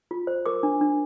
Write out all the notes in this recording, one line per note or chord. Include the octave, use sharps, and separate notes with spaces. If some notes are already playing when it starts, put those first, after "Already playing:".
F4
C5
A#4 D6
D4
D4